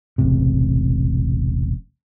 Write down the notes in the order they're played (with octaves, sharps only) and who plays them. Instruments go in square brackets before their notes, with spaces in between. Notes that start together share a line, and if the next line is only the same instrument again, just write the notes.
[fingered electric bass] E1 A1 C3